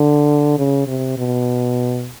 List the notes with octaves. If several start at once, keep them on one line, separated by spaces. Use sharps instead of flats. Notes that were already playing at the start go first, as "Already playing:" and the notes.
Already playing: D3
C#3
C3
B2